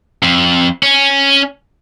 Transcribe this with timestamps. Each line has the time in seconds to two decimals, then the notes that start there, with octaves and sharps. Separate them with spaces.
0.23 F2
0.83 C#4